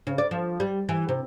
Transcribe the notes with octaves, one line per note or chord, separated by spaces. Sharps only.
C#3
D5
F3
G3
E3
C3